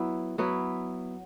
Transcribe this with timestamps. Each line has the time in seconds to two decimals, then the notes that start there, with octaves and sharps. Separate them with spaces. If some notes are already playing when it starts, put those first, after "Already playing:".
Already playing: F#3 B3 E4
0.38 F#3 B3 E4